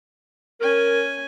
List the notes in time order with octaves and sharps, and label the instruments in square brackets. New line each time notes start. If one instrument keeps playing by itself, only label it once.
[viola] C#4 G#5 [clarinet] A#4